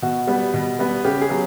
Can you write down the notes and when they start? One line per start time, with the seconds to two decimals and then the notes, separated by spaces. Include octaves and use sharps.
0.02 B2 F#4
0.27 G3 B3
0.54 B2
0.79 G3 B3
1.05 C#3 G4
1.21 G#4
1.29 F#3 B3